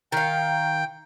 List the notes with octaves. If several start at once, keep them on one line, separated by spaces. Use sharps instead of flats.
D#3 F5 G5